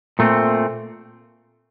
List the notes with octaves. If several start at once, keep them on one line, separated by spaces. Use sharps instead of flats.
A#2 A3 C4